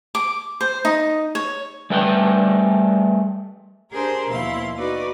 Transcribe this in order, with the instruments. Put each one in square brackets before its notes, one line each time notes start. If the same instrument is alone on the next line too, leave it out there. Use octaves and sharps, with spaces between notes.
[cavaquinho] D6
C5
D#4
C#5
[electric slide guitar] G3 A3 B4 G5
[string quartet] D4 G4 G#4 A#4 C5
D#2 B2 F3 E4 F5 C6
D#4 F#4 B4 D5